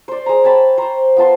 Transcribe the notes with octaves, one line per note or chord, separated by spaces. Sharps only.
C5 D5
G#3 A#5
C#5 G5 A5 B5
C5 A#5
B3 F4 A5 C6